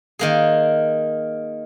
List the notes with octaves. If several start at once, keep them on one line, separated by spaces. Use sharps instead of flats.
D#3 A#3 G#4